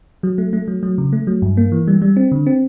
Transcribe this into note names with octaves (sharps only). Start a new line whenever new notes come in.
F#3
A3
A3
F#3
F#3
C#3
A3
F#3
G2
A#3
E3
G3
G3
C4
D3
C4